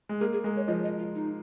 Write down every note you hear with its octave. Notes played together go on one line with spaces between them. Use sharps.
G#3
A#3 G#4
G#4
G#3 A#4
C#5
F3 D#5
D#5
F4
D#4